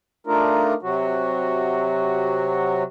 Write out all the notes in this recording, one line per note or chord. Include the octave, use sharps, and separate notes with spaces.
A3 D4 D#4 F4 A#4
C3 F#3 F#4